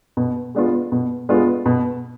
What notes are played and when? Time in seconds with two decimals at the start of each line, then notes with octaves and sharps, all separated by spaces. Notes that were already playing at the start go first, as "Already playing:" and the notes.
0.17 B2
0.55 G#3 B3 D4 F4
0.92 B2
1.29 G#3 B3 D4 F4
1.66 B2